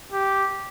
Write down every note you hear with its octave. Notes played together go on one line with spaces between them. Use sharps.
G4